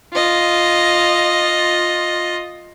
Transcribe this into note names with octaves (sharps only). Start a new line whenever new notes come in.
F4 D#5